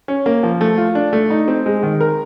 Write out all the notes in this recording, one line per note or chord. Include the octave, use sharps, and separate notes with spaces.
C#4
A#3
F3
A3
F4
D4
A3
D#4
C4
G#3
D#3
A#4